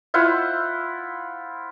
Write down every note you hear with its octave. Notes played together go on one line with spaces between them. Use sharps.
E4 F4 C5 F#5